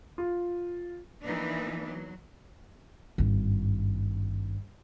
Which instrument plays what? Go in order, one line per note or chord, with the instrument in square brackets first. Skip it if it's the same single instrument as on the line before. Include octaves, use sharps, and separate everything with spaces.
[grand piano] F4
[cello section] E3 F3 A#3 B3 D4 D#4
F#3
[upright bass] G#1 G2